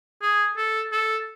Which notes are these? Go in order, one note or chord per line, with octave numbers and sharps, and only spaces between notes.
G#4
A4
A4